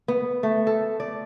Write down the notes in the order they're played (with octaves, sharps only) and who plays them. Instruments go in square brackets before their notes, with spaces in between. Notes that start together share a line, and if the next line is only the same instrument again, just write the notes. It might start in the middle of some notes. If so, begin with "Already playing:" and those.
[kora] B3
A3
A4
D5